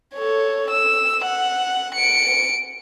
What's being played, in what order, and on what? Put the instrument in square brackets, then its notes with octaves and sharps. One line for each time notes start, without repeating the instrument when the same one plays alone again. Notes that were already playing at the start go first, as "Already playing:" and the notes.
[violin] A4 C#5
E6
F#5
C#7 D7